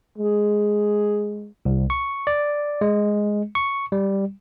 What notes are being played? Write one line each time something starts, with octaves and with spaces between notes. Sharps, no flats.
G#3 G#4
C2
C#6
D5
G#3
C#6
G3